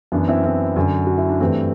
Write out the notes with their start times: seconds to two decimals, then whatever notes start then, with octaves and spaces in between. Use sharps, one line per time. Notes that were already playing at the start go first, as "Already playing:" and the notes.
0.12 F#2 E3 B3 D4
0.28 C4 E4
0.44 C4 E4
0.76 F#2 D3
1.07 F#4
1.18 E4
1.29 D4
1.40 G2 E3 A3 C4